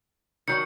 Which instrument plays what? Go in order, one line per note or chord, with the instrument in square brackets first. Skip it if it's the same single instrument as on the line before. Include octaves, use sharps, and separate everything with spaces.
[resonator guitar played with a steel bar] D#3 F#3 [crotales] C#7